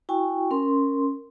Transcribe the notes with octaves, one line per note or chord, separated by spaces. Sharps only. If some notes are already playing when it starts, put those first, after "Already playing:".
E4 F#4 G5 G#5 C#6
C#4 A#4 C6